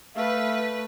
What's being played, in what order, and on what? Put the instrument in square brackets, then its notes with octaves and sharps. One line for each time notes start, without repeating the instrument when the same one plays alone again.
[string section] A3 B4 [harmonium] E5 F5